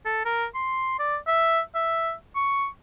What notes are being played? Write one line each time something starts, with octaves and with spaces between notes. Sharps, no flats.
A4
A#4
C6
D5
E5
E5
C#6